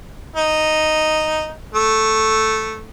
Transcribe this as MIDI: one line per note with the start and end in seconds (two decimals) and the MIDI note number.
0.36 1.50 63
1.75 2.88 57